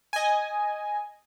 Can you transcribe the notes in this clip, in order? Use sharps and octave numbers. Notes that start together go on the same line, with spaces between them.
D#5 G#5